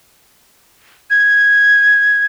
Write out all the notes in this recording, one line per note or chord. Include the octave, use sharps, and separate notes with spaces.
G#6